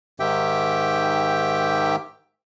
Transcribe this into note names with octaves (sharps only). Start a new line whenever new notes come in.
G#2 D#3 G4 E5 G5